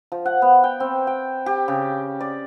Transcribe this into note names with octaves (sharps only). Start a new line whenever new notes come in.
F3
F#5
B3
G5
C4
G5
G4
C#3
D5